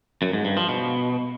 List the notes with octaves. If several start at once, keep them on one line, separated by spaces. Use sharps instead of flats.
F#2
G#2
G2
F3
B2